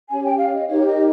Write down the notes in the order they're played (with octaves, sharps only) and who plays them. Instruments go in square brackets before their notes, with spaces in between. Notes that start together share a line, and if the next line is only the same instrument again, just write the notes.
[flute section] C#4 G4 C#5 G#5
G5
F5
D#5
D#4 G4 A#4 C#5
D#5